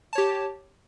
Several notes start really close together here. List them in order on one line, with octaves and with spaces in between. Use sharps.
A5 C#5 G4